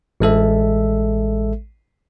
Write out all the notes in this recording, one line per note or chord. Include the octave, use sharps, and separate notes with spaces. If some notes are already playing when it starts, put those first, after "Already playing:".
A1 G#3 A4 E5